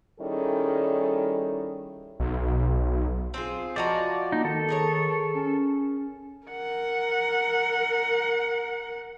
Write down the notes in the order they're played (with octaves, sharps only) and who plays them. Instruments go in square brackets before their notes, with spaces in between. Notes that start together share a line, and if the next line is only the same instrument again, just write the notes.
[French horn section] D#3 G3 C#4 E4 G#4 A4
[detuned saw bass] B1
[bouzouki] C4 F4 G#4
[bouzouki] F3 F#4 A#5 [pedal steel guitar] D5 [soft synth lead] D#5
[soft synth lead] A#3 [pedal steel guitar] D#4
[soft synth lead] D#3 [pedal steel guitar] A4
[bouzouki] G#4 A#4 C#5
[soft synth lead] C#4
[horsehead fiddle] A#4 F#5